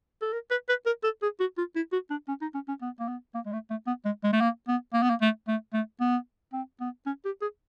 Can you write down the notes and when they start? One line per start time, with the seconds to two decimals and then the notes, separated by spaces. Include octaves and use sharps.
0.22 A4
0.33 A#4
0.51 B4
0.69 B4
0.86 A#4
1.04 A4
1.22 G#4
1.40 F#4
1.58 F4
1.76 E4
1.93 F#4
2.10 D4
2.28 C#4
2.41 D#4
2.54 C#4
2.68 C#4
2.82 B3
2.99 A#3
3.08 B3
3.34 A#3
3.46 G#3
3.53 A3
3.70 A3
3.87 B3
4.05 G#3
4.24 G#3
4.33 A3
4.41 A#3
4.68 B3
4.93 A#3
5.03 B3
5.10 A#3
5.21 A3
5.48 A3
5.73 A3
6.00 B3
6.53 C4
6.81 B3
7.06 C#4
7.25 G4
7.41 G#4